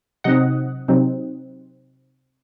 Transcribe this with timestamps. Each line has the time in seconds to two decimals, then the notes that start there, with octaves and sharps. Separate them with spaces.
0.24 C3 F#3 C4 D#4 D#5 F#5
0.88 C3 F#3 C4 D#4